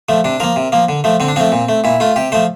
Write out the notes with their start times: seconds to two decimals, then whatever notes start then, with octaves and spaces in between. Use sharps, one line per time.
0.09 F3 A3
0.24 C3 D4
0.40 F3 A#3 A#4
0.56 C3
0.72 F3 A#3
0.89 D3
1.04 F3 A3
1.20 D3 C4
1.28 D4
1.36 F3 A3 C4
1.52 A#2
1.69 A3
1.84 A#2 E4
2.00 A3 F4
2.16 C3 G4
2.32 F3 A3 C5